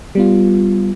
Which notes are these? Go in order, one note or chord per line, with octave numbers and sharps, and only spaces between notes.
G3 B3 F4